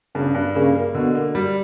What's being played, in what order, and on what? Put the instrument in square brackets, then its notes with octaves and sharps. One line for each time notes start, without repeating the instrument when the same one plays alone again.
[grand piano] G2 [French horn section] C#3
[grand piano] G2
[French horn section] C#3 [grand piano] A#3
[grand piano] A#3
[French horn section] B2 [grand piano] D3
[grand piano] A#3
G3